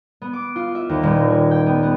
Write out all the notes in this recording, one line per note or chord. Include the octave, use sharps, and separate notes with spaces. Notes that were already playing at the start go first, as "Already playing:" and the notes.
B3
D6
F4
E5
D#2
D#1
G#5
G5
B3
B3